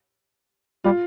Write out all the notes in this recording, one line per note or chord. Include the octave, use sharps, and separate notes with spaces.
G3 F4